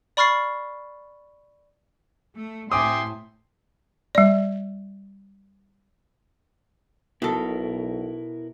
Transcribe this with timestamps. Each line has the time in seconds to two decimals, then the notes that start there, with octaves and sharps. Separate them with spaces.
0.17 D5 B5 C#6 F6 A6 C7
2.36 A3
2.72 A2 E5 G5 G#5 C6 D6 D#6
4.15 G3 D5
7.22 B1 B2 E4 A4 A#4